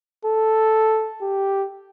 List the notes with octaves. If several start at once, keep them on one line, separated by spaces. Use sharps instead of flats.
A4
G4